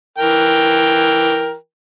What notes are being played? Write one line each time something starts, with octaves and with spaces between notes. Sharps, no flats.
E3 A#4 G5